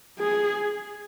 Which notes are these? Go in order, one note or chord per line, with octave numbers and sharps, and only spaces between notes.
G#4